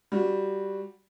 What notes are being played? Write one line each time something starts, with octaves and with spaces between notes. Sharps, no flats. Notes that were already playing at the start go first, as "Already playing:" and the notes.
G3 F#4